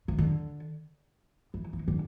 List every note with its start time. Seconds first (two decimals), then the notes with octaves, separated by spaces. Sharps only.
0.08 C3
0.18 D3
1.54 E3
1.73 E3
1.88 D3